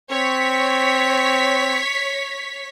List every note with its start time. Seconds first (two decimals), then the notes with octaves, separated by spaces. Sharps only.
0.12 C4 C#5 B6